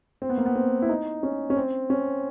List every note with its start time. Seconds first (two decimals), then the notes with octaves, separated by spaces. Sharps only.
0.22 C4
0.29 B3
0.38 A#3
0.46 B3
0.55 C4
0.82 E4
0.89 D#4
1.23 C#4
1.50 C#4
1.57 C4
1.90 C#4